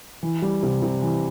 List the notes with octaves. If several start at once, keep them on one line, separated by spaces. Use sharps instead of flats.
E3
G3
C3
C3
E3